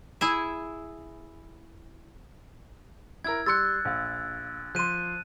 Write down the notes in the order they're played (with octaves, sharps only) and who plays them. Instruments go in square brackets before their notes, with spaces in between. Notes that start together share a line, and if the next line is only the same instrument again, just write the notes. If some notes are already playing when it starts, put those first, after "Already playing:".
[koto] E4 G#4 E5
[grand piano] E4 A#4 [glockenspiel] E6 G#6
[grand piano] G3 C6 C#7 [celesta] E6 [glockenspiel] F#6 A6
[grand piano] A#1 F5
[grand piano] F3 C6 [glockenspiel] F#6 D#7